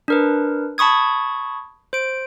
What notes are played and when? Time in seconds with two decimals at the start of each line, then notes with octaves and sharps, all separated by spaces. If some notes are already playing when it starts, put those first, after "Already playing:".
0.08 D4 A#4 B4
0.78 A5 B5 C#6 D#6 G#6
1.93 C5 D7